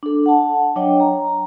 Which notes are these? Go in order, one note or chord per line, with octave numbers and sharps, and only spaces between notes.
D4 A4
F#5 A5
F#3 D4 C#5 D#5 G5
A#5